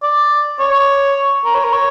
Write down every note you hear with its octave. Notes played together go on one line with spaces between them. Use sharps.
D5
C#5
A#4
C#5
A#4
C#5